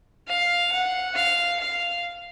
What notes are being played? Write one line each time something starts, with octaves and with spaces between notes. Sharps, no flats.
F5
F#5
F5
F5